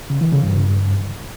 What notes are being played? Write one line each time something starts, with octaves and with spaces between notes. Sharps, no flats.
C#3
E3
C#3
G2